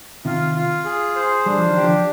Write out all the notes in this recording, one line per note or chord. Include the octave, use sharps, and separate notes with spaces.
C3 D#3 F4
F4
G#4
C5
G3 D4
F3
D#3
G4
D3 F3